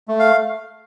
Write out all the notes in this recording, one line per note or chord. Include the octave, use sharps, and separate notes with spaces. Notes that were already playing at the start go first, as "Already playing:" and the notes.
A3
F5